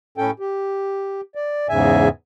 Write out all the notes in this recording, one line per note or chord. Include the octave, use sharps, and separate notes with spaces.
A2 C#4 A4 G5
G4
D5
E2 G#2 C#3 E5 G#5